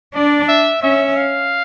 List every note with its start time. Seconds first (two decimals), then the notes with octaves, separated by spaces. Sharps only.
0.14 D4 D5
0.48 E5
0.82 C#4 E5
1.16 F5